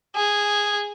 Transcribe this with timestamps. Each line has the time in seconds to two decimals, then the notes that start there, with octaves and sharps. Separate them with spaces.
0.16 G#4